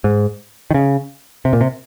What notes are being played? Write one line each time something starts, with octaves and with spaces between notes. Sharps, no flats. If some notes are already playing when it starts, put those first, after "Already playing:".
G#2
D#3
C#3
C3
A#2
C3